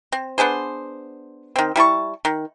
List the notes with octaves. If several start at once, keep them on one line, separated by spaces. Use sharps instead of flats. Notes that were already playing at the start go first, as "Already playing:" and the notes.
C4
B3 D4 G#4 C5
D#3 C4
G3 E4 A5 C#6
D#3